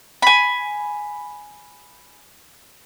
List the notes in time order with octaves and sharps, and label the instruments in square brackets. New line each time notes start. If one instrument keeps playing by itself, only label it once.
[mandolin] G#5 B5